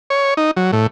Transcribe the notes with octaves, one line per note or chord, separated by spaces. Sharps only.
C#5
D#4
F#3
A2